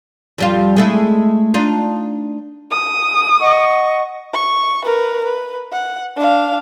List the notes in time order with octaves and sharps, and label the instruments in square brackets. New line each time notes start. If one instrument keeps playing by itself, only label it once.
[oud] F2 G3 F4
G#3 A3 E4
D4 D#4 F4
[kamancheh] D#6
[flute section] D#5 F#5 C#6
[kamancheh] C#6
A#4 B4
B4
F#5
D4 F5